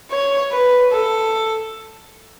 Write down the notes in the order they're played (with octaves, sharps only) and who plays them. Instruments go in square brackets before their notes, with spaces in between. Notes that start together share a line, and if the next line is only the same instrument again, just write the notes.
[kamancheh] C#5
B4
A4